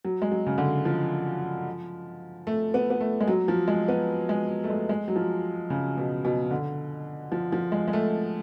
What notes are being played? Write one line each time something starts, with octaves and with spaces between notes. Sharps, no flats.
F#3
G#3
F#3
C#3
D3
F3
A3
B3
B3
A3
G#3
F#3
F3
G#3
B3
G#3
A3
G#3
G#3
F#3
F3
C#3
B2
B2
D3
F3
F3
G#3
G#3
A3